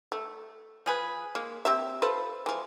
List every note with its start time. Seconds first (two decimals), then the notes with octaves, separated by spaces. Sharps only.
0.12 A3
0.86 F3 G#4 B4
1.35 G#3 A#3
1.65 A#3 C4 G4 E5
2.02 F4 A4 B4 C5
2.46 E3 F3 G#3